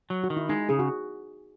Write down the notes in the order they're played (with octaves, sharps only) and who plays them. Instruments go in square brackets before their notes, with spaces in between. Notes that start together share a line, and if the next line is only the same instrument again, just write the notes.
[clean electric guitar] F#3
[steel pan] F#4
[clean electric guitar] D#3
[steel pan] E4
[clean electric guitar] G#3 [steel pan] D#4
[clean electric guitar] C#3 [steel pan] G#4
[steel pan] F#4